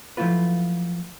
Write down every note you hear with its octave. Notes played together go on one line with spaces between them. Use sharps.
F3 F#3 A3 E4 F4 B4